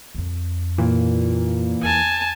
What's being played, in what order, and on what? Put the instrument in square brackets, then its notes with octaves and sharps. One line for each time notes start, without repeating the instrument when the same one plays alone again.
[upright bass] F2 C4
[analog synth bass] A#2 [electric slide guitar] E3 A#3
[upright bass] E2 [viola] G#5 A5